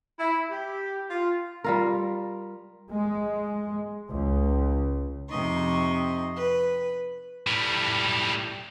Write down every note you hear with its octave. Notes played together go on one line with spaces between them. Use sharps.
E4
G4
F4
G3 F4 A#4
G#3
C#2
F2 C3 D#4 D#5 C6 C#6
B4
A2 G3